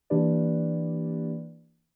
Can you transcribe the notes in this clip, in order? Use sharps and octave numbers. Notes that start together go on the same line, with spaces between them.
E3 A#3 D4 G4 B4 D5